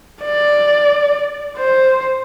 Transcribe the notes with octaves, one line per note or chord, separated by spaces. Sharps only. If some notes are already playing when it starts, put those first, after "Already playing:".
D5
C5